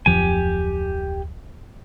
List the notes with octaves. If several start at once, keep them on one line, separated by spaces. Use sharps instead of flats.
D1 F2 F3 G4 G#5